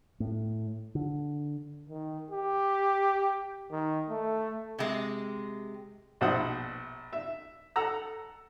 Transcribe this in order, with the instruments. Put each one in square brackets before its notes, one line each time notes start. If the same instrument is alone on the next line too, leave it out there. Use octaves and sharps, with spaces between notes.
[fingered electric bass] A2
D3
[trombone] D#3
G4
D#3
A3
[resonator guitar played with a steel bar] C3 G#3
[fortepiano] A#1 B2 C5 E5 F#5 D#6
E5
A4 F#5 A#5 E6